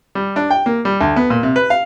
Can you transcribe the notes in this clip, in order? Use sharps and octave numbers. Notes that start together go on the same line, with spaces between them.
G3
D4
G5
A#3
G3
D2
B3
A#2
C3
B4
F5